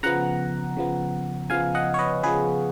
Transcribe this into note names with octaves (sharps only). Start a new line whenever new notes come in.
C#3 F3 B3 F#5 A#5
C#3 F3 B3
C#3 F3 B3 F5 G#5
D#5 F#5
C#5
B4 D#5
C#3 F3 B3 G#4 B4